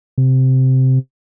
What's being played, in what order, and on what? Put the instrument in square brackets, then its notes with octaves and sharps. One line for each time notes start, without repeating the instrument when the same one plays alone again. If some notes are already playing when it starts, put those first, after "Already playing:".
[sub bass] C3